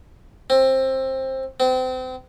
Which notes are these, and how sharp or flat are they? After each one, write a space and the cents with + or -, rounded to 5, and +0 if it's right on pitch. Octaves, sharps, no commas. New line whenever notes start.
C4 +20
C4 -30